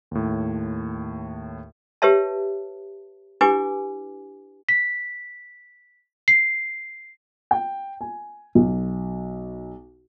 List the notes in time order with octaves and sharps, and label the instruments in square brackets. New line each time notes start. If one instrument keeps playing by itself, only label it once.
[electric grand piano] D#2 A2
[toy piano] G4 B4 C#5 E5 A5
D4 E4 G4 B4 G#5 D6
[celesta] B6
C7
[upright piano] G5
G#5
B1